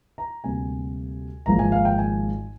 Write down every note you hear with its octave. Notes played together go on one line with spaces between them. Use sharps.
A#5
D2 C3 G3 A#3 G#5
G#1 G#2 F3 A#3 A#5
G#5
F5
G5
G#5